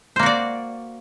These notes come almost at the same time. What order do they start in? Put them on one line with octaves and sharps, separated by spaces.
C5 A#3 F#4 D5